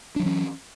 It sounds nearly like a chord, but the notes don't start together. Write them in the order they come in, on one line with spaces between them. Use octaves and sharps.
D4 F#3 E3 C#4